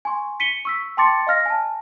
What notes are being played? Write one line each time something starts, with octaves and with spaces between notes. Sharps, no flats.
G#5 C6 C#6
B6 C#7 D#7 G7
C#6 E6 B6
G5 A5 C6 D6 A6 C#7
D#5 F5 F6 A#6
G#5 A5